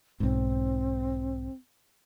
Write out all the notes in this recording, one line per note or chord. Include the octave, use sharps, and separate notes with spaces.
B1 G#2 C4